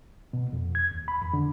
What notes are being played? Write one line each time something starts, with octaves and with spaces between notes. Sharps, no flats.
B2
F2
G#6
D#2
B5
F2
D3